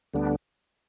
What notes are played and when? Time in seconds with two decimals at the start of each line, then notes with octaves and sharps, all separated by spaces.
0.14 D2 D3 G3 B3 D4